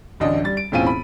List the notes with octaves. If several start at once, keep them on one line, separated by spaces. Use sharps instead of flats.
A1 D2 D4 D#5
G3 A6
D7
E1 A2 C4 C#4 F4 D#7
B5